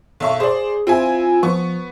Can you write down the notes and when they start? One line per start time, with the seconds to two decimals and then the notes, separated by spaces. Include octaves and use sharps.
0.20 B1 E5 C#6
0.40 G#4 C5 D5
0.87 C4 E4 F4 G#5
1.43 F3 B3 C#6